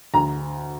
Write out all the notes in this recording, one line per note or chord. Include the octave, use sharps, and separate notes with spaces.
D2 A#5